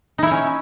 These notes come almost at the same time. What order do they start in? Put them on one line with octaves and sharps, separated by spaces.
D#4 E4 C#5 C#4